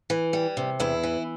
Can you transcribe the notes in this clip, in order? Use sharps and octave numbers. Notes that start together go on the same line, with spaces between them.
E3
G3
C3
E2 E4
E3